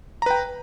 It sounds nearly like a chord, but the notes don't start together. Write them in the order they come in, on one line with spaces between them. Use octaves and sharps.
A#5 B4 G5